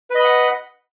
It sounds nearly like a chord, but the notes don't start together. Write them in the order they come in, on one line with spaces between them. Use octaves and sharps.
B4 D#5 B5 F#5